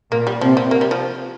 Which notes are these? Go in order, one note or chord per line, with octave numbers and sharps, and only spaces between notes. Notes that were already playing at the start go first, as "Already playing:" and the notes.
A#2 A#3
G3
C3 F3
G3
A#3
G3
F3